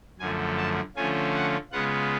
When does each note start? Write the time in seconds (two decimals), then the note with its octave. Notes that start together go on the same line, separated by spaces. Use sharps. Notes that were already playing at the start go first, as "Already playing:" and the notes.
0.19 F#2 D3 F3 A3 G#5
0.58 A5
0.96 D3 F3 A3 C#4 F4 G#5
1.34 F#5
1.72 C#3 G#3 B3 F4 F#5